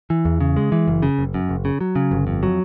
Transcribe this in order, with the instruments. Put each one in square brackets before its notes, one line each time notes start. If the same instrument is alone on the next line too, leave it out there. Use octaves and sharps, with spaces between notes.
[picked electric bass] E3
E2
C#3
G#3
E3
F#1
C#3
F#1
F#2
F#1
C#3
F#3
C#3
G1
F2
F#3